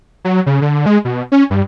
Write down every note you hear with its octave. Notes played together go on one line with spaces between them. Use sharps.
F#3
C#3
D3
G#3
B2
C#4
G2